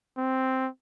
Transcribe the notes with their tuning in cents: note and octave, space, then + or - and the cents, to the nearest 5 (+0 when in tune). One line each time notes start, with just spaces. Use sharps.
C4 +0